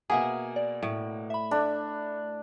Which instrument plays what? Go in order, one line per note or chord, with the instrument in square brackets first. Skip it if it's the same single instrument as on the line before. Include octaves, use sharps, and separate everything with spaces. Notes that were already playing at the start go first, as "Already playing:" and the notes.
[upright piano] B2 A#3 [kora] G#4 [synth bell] E5 F#5 G#5
[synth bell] D5
[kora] A2
[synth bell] E5 B5
[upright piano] A3 [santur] D4